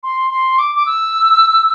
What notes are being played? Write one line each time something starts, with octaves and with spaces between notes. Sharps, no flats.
C6
C6
D6
D6
E6